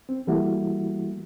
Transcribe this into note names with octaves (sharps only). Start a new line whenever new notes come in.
C4
E3 G3 A3 A#3 E4 F#4